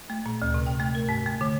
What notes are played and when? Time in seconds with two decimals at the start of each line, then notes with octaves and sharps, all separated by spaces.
0.10 A3
0.26 A#2
0.42 D2
0.54 C3
0.66 G5
0.80 A3
0.95 A#4
1.09 G#2
1.26 A3
1.41 D3